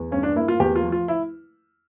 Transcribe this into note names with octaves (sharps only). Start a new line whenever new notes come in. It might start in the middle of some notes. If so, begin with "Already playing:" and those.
Already playing: E2
G2 C#4
D4
A#3 E4
F4
E2 G4
F4
F3
F4
E4